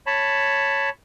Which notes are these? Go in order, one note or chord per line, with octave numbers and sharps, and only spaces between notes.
C#5 A5 B5